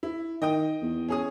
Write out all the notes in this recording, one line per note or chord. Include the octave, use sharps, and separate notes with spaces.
E4
D#3 D#5 G5 D#6
E2
C#4 G#4 D#6